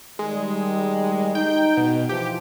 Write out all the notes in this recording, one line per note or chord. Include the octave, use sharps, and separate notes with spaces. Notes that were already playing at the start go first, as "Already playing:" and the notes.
D#3 G3 G#3
D#4 G5
B2
E3 F3 G4